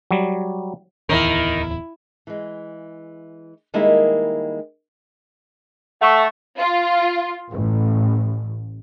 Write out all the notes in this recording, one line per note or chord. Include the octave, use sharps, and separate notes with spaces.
F#3 G3
D1 E2 D#3 E4 A#4
E3 G#3
D#3 G3 G#3 A#3 E4 A#4
A3 F#5 C#6
F4
A1